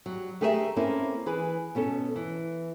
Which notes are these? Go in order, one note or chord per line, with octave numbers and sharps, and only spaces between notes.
F#3 G3
A3 G4 G#4 A#4 B4 E5
A#3 C4 C#4 E4 A4
E3 G#4 B4
B2 B3 C#4 A4
E3